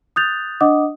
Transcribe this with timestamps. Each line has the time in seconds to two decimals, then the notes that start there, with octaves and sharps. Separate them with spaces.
0.16 D#6 F#6 G6 A6 F7
0.61 D4 D#5 F#5 D6 D#6